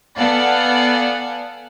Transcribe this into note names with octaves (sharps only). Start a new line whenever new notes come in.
B3 A4 D5 F5 F#5 G#5